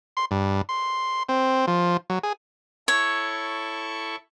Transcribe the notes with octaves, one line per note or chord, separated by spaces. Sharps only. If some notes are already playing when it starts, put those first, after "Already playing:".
C6
G2
C6
C4
F3
F#3
G#4
E4 A4 C#5 C#6